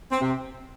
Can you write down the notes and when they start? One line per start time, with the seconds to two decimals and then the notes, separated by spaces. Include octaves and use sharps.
0.11 C4
0.21 C3